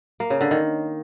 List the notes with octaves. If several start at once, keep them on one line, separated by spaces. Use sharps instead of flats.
A#3
C#3
D3
D#3